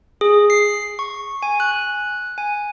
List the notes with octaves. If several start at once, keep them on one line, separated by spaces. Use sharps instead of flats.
G#4
C7
C#6
G#5
F#6
G#5